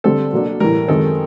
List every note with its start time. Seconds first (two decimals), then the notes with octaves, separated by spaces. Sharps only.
0.04 D3 G3 C4 A4
0.33 B2 F#3 A#3 D4
0.60 A2 E3 G3 A#4
0.88 F#2 D#3 G#3 C4 A4